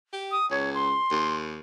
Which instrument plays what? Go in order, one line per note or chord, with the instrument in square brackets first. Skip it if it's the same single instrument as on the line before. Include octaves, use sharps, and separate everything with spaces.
[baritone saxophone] G4
[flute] D#6
[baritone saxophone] C#2 [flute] C#5
[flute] C6
[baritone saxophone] D#2